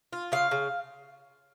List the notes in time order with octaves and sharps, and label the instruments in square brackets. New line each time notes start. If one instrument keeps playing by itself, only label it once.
[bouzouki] F4
C#3 F5
C#3